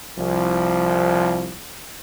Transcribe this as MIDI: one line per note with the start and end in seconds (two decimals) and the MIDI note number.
0.19 1.54 36
0.19 1.54 53